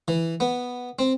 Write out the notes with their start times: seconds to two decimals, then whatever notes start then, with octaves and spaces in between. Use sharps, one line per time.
0.08 E3
0.40 B3
0.99 C4